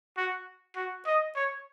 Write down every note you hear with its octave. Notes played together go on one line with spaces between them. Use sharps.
F#4
F#4
D#5
C#5